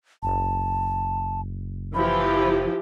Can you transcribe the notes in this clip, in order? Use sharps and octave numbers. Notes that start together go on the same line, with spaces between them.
F#1 A5
E3 F3 G4 B5